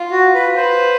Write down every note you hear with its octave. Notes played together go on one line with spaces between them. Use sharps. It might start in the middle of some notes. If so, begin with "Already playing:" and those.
Already playing: F4
F#4
B4
B4 C5